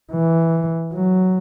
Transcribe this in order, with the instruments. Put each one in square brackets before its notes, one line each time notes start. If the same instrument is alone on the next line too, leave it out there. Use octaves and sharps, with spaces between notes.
[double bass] E3
F#3